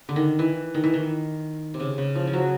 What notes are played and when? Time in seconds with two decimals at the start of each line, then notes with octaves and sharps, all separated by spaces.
0.09 D3
0.16 D#3
0.39 E3
0.74 D#3
0.84 E3
0.94 D#3
1.74 C3
1.80 C#3
1.98 C#3
2.15 F3
2.27 F3
2.33 F#3